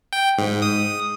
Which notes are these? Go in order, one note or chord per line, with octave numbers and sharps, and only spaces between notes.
G5
G#2
D#6